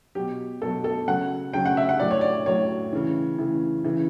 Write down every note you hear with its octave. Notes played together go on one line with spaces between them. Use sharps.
B2 F#3 G4
B2 F#3 A4
A4
C#3 F#3 F#5
C#3 F#3 G5
F#5
E5
F#5
A2 F#3 D5
C#5
D5
A2 F#3 C#5
C#3 E3
C#3 E3
C#3 E3